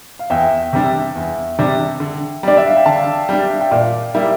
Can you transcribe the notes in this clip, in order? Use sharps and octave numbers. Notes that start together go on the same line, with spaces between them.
F5
E2 E5 G5
C3 G3 D4
E2
C3 G3 D4
D3
G3 D4 D5
E5
F5
G5
D3 F5 A5
G3 D4
G5
A#2 D5 F5
G3 A#3 E4